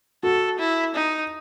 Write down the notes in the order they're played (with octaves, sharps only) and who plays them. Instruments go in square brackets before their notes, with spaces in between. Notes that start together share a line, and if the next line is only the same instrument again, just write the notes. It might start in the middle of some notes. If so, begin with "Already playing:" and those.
[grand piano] F#4 [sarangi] A4
[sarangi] E4
D#4